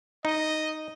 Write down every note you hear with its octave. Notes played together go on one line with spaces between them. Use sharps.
D#4 D#5